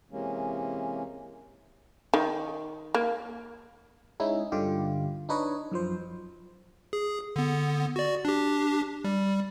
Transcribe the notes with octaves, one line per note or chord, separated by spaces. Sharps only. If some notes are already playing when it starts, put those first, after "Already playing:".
C3 E3 G#3 A#3 C#4
D#3
A#3
G#3 C#4 D#4 E4 G#4
G2 D3 F4 G4
D4 D#4 B4 C#5 D#5
F#2 F3 C5
G#4
D3 B3
F#4 D5
D4 G4
G3